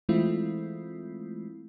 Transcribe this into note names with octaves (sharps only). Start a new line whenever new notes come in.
E3 G#3 A3 C4 E4 F4